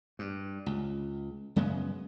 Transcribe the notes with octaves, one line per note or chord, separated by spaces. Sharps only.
G2
C#2
F#2 C#3 G#3 B3